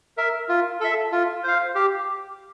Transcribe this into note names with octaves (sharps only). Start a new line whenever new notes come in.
A#4 E5
F4
A4 E5
F4
C5 F5
G4